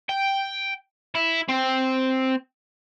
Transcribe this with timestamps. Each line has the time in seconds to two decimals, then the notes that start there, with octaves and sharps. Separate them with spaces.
0.09 G5
1.15 E4
1.49 C4